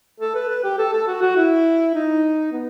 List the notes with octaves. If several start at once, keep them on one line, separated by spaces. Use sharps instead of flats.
A4
B4
B4
G4
A4
A4
F#4
F#4
E4
D#4
B3